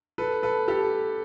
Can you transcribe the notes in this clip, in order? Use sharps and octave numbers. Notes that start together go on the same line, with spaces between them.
A4 B4
A4 B4
G4 A4